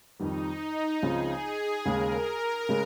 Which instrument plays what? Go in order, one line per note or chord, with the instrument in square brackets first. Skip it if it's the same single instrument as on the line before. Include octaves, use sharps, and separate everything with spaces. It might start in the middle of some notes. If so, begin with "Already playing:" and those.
[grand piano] F2 D#3 G3 [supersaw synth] D#4
[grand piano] C#2 C#3 F3 C4 F4 [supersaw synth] G#4
[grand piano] D#2 C#3 G#3 [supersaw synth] A#4
[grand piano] C#3 G#3